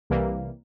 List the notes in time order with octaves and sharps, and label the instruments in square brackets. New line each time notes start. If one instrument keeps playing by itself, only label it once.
[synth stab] C2 C3 E3 G3 A#3